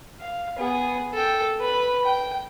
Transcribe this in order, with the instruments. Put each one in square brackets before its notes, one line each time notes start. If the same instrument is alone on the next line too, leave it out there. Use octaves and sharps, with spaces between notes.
[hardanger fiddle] F5
B3 G#4
A4 G5
B4 B5
G5